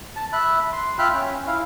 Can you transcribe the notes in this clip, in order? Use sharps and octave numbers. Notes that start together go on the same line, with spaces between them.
A5
E5 B5 F#6
C6
F4 E5 G5 B5 F6 F#6
C#4
E4 F5